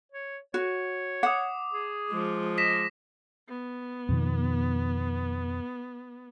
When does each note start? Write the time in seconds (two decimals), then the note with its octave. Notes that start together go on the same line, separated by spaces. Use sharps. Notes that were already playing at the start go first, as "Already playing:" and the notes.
0.12 C#5
0.54 F#4 C#5
1.23 F#5 D6 D#6
1.72 G#4
2.09 F3 G#3
2.58 D#5 A#6 B6 E7
3.49 B3
4.09 F2 B2 D#3